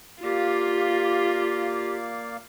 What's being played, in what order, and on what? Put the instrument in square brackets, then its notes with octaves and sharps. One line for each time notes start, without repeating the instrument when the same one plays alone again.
[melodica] A#3 D5 F5 [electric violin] F4 [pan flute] G4